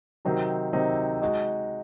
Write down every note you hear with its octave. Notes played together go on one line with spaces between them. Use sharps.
C3 D#3 F#3 C4 D#4
C3 D#3 F#3 C4 D#4
G#3 D#4 F#4